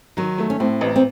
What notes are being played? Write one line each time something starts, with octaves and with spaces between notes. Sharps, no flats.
D#3 F#3
A3
C#4
A2 C4
A1
C4